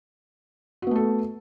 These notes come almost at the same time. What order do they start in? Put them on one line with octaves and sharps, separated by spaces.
F#4 B3 A3 A4